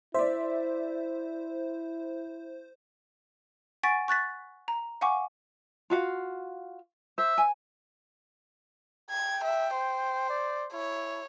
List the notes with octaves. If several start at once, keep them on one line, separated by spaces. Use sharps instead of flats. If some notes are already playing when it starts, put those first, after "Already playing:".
E4 C5 D5 E5
F#5 G#5 C#6 A6 B6 D7
C#6 F#6 A6 B6
A#5
F5 F#5 G#5 C#6 D6
F4 F#4 F5
C5 E5
G#5
G5 G#6
E5
C5
D5
E4 C#5